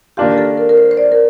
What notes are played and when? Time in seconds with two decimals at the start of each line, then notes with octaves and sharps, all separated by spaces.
0.17 D#3 A#3 D4 F4 G4
0.38 A4
0.58 A#4
0.69 A#4
0.77 C5
0.91 C5
0.97 D5
1.12 A#4